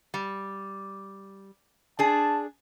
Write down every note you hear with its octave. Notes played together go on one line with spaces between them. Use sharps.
G3
D4 G#4 A5